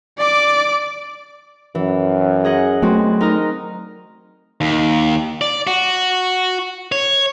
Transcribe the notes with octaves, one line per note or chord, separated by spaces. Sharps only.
D5 D6
F#2 E3
G#4 D#5 F#5
F#3 A3 C4 F#4
D#4 A#4 D#5
D#2
D5
F#4
C#5